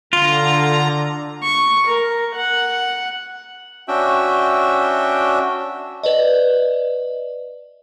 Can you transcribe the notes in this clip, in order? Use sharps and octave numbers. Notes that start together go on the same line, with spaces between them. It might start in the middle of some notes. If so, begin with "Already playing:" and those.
D3 F4 A#5
C#6
A#4
F#5
C#4 D4 F#4 E5 G5
B4 D5 D#5